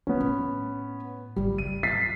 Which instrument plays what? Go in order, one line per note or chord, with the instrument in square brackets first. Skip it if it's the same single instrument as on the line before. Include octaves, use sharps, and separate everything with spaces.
[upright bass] E2 [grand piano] B3 C#4
[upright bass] A2
[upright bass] G#1 C#2 [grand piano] G3
[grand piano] D#7
[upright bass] G#1 F#2 [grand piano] A6 B6 C7